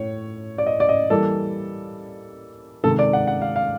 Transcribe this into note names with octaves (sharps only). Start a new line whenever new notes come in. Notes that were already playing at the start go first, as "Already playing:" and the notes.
Already playing: A2 C#5
D5
D#5
D5
D#5
E3 G3 A#3 A4
C3 D#3 G#3 A4
D5
F#5
F#5
F5
F5